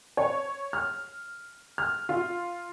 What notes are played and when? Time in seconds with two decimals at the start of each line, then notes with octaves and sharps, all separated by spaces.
0.17 C#5
0.73 F6
1.78 F6
2.09 F4